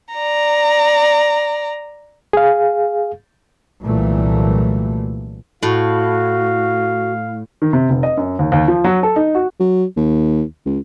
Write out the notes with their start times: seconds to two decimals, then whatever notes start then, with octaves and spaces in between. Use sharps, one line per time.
0.14 D5 A#5
2.33 G#4 F5
3.82 C2 A#2 E3 F#3 A3
5.63 A2 F#4 F5
7.62 D#3
7.73 C3
7.90 F1
8.03 D#5
8.17 F#2
8.39 D#2
8.52 D#2
8.68 F3
8.84 F#3
9.03 A4
9.16 D#4
9.35 F#4
9.60 F#3
9.97 D#2
10.66 C#2